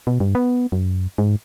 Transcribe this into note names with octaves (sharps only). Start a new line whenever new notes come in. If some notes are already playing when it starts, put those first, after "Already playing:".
B2
G2
B3
F#2
G#2